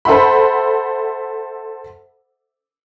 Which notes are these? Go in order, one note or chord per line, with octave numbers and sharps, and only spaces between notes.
A4 C5 E5 F#5 B5